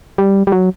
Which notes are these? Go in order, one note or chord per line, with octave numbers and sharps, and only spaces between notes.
G3
G3
F#3